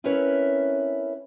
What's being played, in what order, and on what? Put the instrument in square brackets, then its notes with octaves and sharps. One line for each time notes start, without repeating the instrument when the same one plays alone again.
[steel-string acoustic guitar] C4 C#4 E4 A#4 B4 C#5